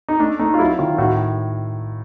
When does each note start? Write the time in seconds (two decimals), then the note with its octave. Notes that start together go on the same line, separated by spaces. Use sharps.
0.09 D#4
0.20 A3 D4
0.39 A3 D#4
0.54 F4
0.59 F#3 E4
0.79 D#3 F4
0.98 A2 F#4